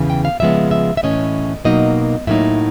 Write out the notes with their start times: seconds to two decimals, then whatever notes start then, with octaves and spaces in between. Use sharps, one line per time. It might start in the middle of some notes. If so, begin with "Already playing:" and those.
Already playing: E2 C#3 E3
0.10 G5
0.25 F5
0.40 C#3 F3 G#3 B3 E5
0.71 E5
0.97 E5
1.03 A2 E3 A3 C#4 D#5
1.65 B2 F#3 A#3 D#4 D#5
2.27 A2 F#3 A#3 D#4 E5